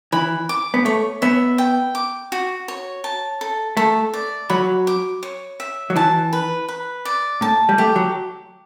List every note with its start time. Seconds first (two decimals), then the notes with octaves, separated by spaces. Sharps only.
0.12 E3 B5
0.49 D6
0.74 B3
0.85 A3 C#5
1.22 B3 E5
1.58 G5
1.95 D6
2.32 F#4
2.68 C#5
3.04 A5
3.41 A4
3.77 A3 A4
4.14 D5
4.50 F#3 B5
4.87 D6
5.23 C#5
5.60 E5
5.90 F#3
5.96 E3 A5
6.33 B4
6.68 B4
7.05 D5
7.41 A2 A5
7.69 G3
7.78 A3 G4
7.96 F#3